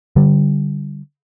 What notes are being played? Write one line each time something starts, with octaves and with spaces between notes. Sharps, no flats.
D3 G3